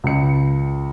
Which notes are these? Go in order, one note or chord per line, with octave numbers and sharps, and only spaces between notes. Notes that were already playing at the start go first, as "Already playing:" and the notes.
C#2 C#7